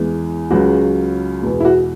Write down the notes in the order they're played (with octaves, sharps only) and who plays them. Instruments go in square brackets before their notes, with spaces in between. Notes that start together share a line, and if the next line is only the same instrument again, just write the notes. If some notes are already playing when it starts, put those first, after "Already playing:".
Already playing: [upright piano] E2 E3 G#3
C#2 C#3 F#3 F#4
E2 B2 G#3
E4
F#4